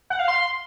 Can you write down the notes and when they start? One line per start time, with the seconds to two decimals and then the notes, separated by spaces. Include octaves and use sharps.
0.10 F#5
0.19 F5
0.28 C6